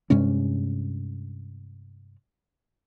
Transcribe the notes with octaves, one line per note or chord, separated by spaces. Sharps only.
G2 C3 G#3 C#4